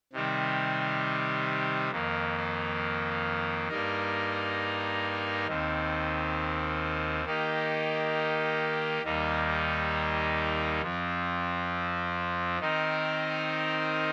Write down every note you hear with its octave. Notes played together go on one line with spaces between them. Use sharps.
C3 D#3 G3 C4
F2 D#3 A#3
G2 G3 A#3 D#4 A#4
D#2 D#3 C4
D#3 A#3 D#4 G4
D#2 D#3 G3 A#3 D#4
F2 F3 C4
D#3 C4 D#4 A#4